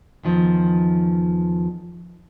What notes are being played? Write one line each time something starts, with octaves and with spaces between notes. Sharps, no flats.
E2 D#3 F3